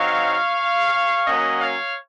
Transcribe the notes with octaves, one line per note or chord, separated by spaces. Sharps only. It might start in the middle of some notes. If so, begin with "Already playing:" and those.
Already playing: F#3 C4 D#4 C#5 F5
F#3 A#3 C#4 D#5 F#5
C#5 F5